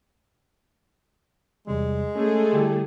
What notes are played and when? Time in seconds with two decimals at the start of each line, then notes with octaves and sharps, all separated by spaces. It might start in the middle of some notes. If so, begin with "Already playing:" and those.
1.67 E2 C3 G3 G#3
2.15 A3 C#4 G#4 A4
2.53 D3 G3 E4 G4